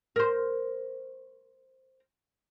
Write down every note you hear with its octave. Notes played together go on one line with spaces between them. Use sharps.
A#4 C5